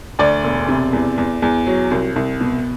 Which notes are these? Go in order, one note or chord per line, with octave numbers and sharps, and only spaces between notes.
D2 D5
E1
C3
E2
E2
E2
F#3
C2
C2
B2